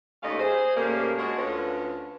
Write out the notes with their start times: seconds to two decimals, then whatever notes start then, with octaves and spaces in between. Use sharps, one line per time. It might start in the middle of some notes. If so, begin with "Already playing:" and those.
0.22 D#2 G3 A3 C#4 D#5 F5
0.39 G#4 C5
0.76 A2 C#3 G3 A#3
1.18 G#3 D4 F#4 C#5
1.37 D2 D3 C#4 F4 B4